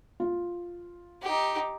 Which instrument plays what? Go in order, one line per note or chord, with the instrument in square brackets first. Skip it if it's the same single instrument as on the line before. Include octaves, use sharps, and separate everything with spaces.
[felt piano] F4
[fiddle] D#4 G4